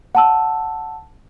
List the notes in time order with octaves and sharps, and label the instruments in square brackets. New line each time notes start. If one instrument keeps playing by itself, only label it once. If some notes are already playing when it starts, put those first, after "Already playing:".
[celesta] F#5 A5 E6